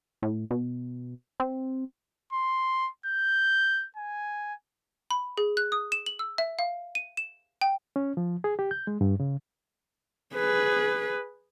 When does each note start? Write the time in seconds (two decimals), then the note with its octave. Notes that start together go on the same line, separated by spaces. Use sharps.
0.22 A2
0.51 B2
1.40 C4
2.33 C6
3.06 G6
3.97 G#5
5.11 B5
5.38 G#4
5.57 F#6
5.72 D#6
5.92 E7
6.06 F#7
6.19 E6
6.38 E5
6.59 F5
6.95 D#7
7.17 E7
7.61 G5
7.96 C#4
8.17 F3
8.44 G#4
8.59 G4
8.71 G6
8.87 G#3
9.01 G2
9.20 C#3
10.35 G#4 B4